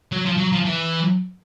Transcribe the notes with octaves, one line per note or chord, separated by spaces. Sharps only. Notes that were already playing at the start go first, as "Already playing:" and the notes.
F#3
F3
F#3
F3
E3